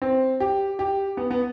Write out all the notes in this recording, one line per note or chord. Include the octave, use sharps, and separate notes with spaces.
C4
G4
G4
B3
B3